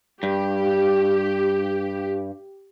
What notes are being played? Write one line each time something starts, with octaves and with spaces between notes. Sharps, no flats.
G2 G4